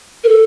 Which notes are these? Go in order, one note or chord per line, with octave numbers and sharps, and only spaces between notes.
A#4
A4